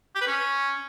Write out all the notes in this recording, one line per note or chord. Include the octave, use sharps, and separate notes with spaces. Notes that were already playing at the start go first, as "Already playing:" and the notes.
G4
B4
C#4